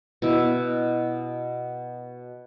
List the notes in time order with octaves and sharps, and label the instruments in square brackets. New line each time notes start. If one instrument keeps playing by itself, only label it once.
[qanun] B2 E4